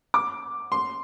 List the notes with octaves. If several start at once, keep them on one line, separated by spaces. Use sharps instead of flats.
D6
C6